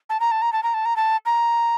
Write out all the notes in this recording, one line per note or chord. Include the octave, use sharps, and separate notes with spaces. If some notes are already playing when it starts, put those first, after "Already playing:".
A5
A#5
A5
A#5
A5
A#5
A5
A#5
A5
A#5